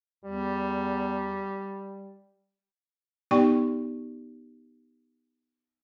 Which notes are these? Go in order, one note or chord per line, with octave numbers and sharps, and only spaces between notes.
E2 G3
B3 D#4 G4 D5 G5 C#6